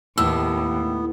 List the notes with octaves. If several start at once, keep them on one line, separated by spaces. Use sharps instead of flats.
D#2 A2 B3 E6